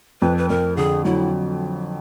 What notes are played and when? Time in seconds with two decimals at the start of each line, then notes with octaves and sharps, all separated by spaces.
0.21 F2 B4
0.38 B4
0.49 F2 A#4
0.77 D3 G#4
1.05 F#3 E4